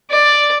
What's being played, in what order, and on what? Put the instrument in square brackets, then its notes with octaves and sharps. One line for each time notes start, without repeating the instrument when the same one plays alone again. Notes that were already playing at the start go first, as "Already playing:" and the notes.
[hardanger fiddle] D5